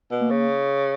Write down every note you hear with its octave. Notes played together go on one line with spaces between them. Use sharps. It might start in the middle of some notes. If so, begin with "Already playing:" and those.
B2
A#3
C#3